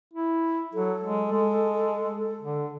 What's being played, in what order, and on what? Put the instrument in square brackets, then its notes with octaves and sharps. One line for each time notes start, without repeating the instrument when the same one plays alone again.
[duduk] E4
[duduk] F#3 [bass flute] A4
[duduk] G#3
G#3
D3